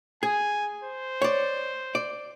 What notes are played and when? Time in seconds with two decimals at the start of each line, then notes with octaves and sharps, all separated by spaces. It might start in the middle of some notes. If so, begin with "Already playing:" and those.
0.23 G#4 G#5
0.84 C5
1.22 C#5 D5
1.95 D5